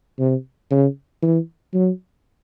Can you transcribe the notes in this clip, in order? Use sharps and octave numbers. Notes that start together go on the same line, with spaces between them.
C3
C#3
E3
F#3